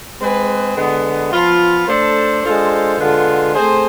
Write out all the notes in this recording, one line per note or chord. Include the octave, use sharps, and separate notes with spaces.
G#3 C4 G#4 B4
D3 G#3 B3
F3 B3 F4
A3 D4 A4 C5
G#3 D4 F4 A4 C5
D3 G#3 B3 F4 A4
A3 C4 G#4 C5